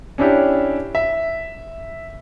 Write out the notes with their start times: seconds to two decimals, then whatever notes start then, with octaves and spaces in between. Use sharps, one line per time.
0.18 C#4 D4 E4 G4
0.95 E5